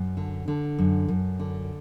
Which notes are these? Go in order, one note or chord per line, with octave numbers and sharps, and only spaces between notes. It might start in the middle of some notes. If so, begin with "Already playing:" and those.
Already playing: F#2
D3
D3
F#2
F#2
D3